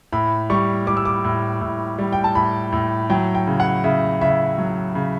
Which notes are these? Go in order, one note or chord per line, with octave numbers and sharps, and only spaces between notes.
A2 B5
G3 C#6
G3 D6
E6
D6
A2
A2
G3
G5
A5
A2 B5
A2
F#3 G5
G5
C#3
F#5
C#3 E5
C#3 E5
F#3
C#3